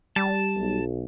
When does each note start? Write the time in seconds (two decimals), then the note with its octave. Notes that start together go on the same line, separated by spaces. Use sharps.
0.16 G3 A5
0.56 B1